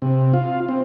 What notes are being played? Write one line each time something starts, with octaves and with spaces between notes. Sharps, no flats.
C3
F4
C4